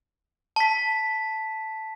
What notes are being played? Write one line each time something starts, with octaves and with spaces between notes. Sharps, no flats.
A5 B6